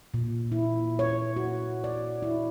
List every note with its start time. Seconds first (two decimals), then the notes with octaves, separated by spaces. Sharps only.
0.14 A#2
0.52 E4
0.99 C#5
1.36 F#4
1.84 D5
2.22 E4